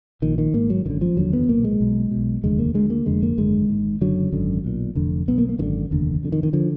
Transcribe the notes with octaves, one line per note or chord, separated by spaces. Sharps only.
A#1 A#2 D#3
D#3
G#1 G#2 A#3
F#3
G#1 F#2 D3 D#3
F3
F1 D#2 D3 F#3
B3
B1 A#2 A#3
G#3
B1 B2
B1 B2
F1 D#2 D3 G#3
A#3
D2 D3 G#3
A#3
F1 F2 D3 G#3
A#3
G#1 F#2 D3 G#3
G#1 G#2
F#1 F#2 D3 F#3
G#1 F#2 D3
B1 A#2
F1 F2 D3
B1 B2 B3
A#3
A#3
G#1 F#2 D3 D#3
F1 D#2 D3
F1 F2 D3
D#3
D#3
D3 F3